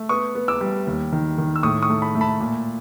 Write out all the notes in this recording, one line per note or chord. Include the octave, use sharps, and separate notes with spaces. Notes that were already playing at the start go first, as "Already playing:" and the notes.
Already playing: A3
B3 C#6 D#6
B3
D6 E6
G3
D#2
D#3
D#3
E6
A2 C#6 D#6
C#6 D#6
A3
A5 B5
A3
A5 B5
A#2